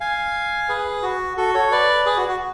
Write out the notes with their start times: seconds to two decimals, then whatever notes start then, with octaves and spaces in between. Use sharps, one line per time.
0.01 F5 G#5
0.69 G#4 B4
1.03 F#4
1.37 F#4 A4
1.55 A4 C#5
1.72 B4 D5
2.06 G#4 B4
2.17 F#4
2.29 F#4